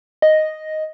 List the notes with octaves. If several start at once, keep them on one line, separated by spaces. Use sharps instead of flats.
D#5